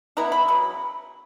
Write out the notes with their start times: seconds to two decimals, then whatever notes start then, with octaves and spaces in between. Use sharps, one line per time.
0.17 E3 B3 E4 A#5
0.32 B5
0.48 C#3 F#3